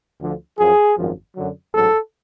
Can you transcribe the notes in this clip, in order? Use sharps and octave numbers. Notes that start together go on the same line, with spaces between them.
D2 D3 F3
F#2 F3 G#4
G#1 F#2 F3
F#2 D3 F#3
A1 G#2 F#3 A4